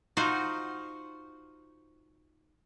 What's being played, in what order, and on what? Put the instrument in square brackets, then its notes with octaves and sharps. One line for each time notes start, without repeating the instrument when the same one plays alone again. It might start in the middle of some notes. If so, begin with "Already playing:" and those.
[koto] D#4 F4 F#4 C5 D#5